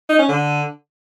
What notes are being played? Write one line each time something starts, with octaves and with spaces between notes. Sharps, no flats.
D#4
C#4
D3